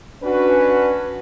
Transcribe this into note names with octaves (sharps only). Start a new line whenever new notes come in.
C#4 D4 F#4 B4